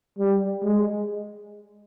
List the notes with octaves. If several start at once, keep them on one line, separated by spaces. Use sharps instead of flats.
G3
G#3